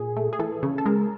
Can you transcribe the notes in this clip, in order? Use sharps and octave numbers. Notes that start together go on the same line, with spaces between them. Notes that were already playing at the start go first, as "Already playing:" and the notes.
Already playing: A#2 G#4
A3
G#4
E3 A4
C#3
A4
G#3 A#4